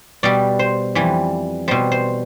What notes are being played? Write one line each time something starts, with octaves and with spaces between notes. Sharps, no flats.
B2 G3 D5
C5
F2 E3 G3
B2 G3 C5
C5